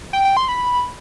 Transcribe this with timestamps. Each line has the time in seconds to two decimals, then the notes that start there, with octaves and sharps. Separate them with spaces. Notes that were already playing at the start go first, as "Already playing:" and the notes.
0.13 G5
0.25 G5
0.37 C6
0.48 B5